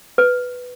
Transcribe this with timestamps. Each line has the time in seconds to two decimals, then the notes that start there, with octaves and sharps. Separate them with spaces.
0.18 B4